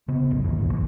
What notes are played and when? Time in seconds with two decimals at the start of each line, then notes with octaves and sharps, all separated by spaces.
0.08 C#3 B3
0.31 G#1 C#2 F#2
0.44 D#2 E3
0.59 A#1 G2 A#2
0.73 A1 E3